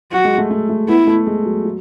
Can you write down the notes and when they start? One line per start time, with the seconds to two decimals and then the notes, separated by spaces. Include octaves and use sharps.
0.12 F#3 F#4
0.25 G#3
0.38 A3
0.51 A3
0.69 A3
0.88 B3 E4
1.07 A3
1.27 G#3
1.46 F#3
1.65 F#3